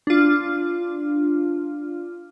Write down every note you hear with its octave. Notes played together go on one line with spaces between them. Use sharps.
D4 F4